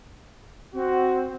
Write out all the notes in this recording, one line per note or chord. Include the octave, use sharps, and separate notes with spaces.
C4 F#4